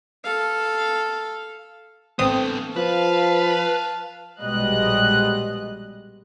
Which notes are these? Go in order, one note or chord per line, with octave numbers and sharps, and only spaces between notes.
A4 F5
A1 B3 C4 A4 D#6
F3 B4 F5 A5
A#1 B2 G3 G#3 D#5 F#6